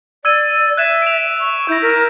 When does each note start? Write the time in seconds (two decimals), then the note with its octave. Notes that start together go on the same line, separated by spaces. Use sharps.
0.25 D5 E6 G#6 D#7
0.77 E5 F#6 G#6 E7
1.02 D7 F7
1.40 C#6
1.69 E4 G6 A#6
1.82 A#4 B6